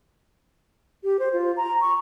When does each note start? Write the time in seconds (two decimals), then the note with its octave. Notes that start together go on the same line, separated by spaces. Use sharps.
1.04 G4
1.19 C5
1.33 F4
1.57 A#5
1.81 C#6